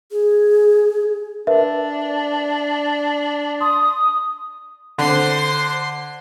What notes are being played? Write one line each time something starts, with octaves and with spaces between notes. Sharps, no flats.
G#4
D4 A#4 B4 E5
C6 D#6
D3 C5 C6